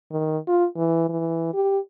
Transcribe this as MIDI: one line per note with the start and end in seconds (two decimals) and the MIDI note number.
0.11 0.38 51
0.47 0.65 65
0.77 1.05 52
1.09 1.51 52
1.54 1.79 67